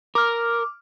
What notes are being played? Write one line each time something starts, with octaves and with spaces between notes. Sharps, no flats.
A#4 D6 F6